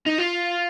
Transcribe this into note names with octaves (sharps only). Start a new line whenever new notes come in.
D#4
F4